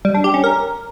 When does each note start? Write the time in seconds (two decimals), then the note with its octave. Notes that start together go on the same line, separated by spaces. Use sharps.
0.05 G3
0.15 D4
0.24 G4
0.34 C#4
0.44 A#4